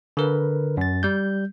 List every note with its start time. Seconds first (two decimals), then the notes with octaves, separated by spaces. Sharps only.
0.17 D3 A#4 B4
0.77 F#2 A6
1.03 G3 G6